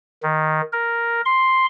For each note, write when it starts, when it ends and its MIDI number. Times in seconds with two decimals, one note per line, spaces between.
0.23 0.61 51
0.73 1.21 70
1.26 1.66 84